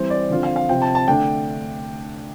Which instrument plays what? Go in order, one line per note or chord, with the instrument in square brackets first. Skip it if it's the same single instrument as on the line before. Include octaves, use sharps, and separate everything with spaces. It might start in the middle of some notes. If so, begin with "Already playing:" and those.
Already playing: [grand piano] E3 G3 C4 C5
D5
D3 F3 C4 F4
F5
F5
C3 F3 C4 G5
A5
A5
D3 A3 D4 G5